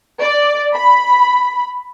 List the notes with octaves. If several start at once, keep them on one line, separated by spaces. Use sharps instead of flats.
D5
B5